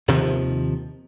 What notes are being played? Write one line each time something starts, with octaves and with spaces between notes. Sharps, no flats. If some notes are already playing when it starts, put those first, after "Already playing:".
D#2 C3 D#3 F3